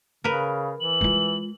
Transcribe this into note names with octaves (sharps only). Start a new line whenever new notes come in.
C#3 A#4 B4
E3 F#7
G#3 F4